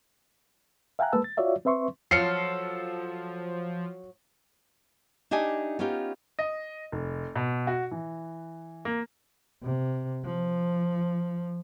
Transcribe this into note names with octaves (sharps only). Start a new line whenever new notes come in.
E5 F5 G5 G#5 A#5 F#6
G#3 A#3 B4 A5 E6
A6
F4 F#4 C#5 D5 E5 F5
C4 B4 E5 C6 C#6
F3 F#3 F4 A4 F6 C7 C#7
D4 D#4 G4 D#5 E5 G#5
B3 C#4 D#4 F4 G4
D#5
F1
B2
F#4
E3
A#3
C3
F3